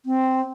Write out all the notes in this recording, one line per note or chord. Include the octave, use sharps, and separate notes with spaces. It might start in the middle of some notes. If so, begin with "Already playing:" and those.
C4